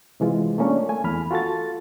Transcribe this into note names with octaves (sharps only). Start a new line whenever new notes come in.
C3 E3 G#3 F4
A3 A#3 C#4 D4
A3 G#5
E2 B5 F6
F4 F#4 A4 A6